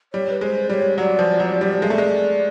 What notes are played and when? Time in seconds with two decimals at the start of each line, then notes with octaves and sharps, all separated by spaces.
0.13 G3 C#5
0.30 B4
0.41 G#3 C5
0.69 G3 D5
0.73 C#5
0.98 F#3 D5
1.19 F3
1.40 F#3
1.61 G3
1.82 G#3 F5
1.87 A3 D5
1.98 G#3